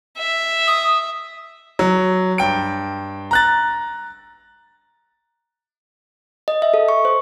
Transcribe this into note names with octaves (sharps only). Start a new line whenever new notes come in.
E5
D#6
F#3
G2 G5 D7
A#5 F#6 A6
D#5
E5
A4
C#6
C5